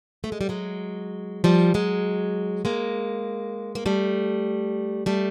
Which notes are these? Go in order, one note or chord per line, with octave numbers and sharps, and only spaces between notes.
A3
G#3
G3
F#3 G#3
F3 G3
F#3 G#3
G#3 A#3
A#3
G3 A3
G3 A3